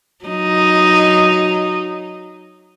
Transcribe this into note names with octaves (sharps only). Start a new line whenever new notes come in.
F#3 D#4